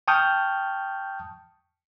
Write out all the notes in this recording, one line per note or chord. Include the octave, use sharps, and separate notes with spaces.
G5 A5 C#6 D#6 F6 G6